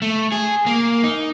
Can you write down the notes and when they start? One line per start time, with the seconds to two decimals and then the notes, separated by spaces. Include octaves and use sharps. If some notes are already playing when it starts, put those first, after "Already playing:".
0.02 A3
0.32 G#4
0.66 A#3
1.04 D#4